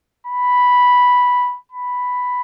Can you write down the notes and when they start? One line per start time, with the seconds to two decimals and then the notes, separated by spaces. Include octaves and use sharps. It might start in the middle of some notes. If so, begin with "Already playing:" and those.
0.27 B5
1.72 B5